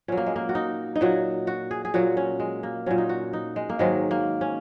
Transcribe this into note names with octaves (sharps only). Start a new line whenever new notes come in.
A#2 F#3 C#4
A#3
G#3
A#3
F#4
D#4
D#4
A#2 F#3 F#4
F#4
G#4
G#4
A#2 F#3 F#4
C#4
G#3
A#3
A#2 F#3 C#4
D#4
F#4
D#4
G#3
A#3
G#2 D#3 F#3 G#3
A#3
C#4